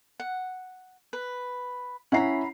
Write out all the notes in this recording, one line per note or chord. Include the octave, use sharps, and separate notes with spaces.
F#5
B4
C#4 E4 F#5 A#5 B5 C7